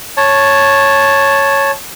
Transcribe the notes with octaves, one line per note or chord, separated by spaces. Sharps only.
C#5 A5